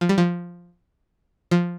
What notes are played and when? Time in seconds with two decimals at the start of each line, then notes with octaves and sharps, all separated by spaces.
0.01 F3
0.09 G3
0.18 F3
1.51 F3